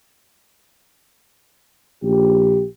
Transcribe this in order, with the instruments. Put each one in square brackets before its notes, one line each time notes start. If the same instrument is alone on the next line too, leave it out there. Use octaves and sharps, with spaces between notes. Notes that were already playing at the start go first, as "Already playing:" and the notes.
[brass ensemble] A#1 G4